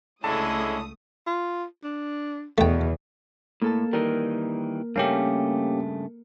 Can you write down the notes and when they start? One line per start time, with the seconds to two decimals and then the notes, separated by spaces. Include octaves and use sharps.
0.24 C#2 D3 G#3 A3 C#4 E4 A5 D#6
1.27 F4
1.83 D4
2.58 E2 B2 A3 G5
3.62 A2 A#3 A4 A5
3.93 D#3 E3 G3 A#4
4.96 G2 C#3 A3 A#3 C#4 G4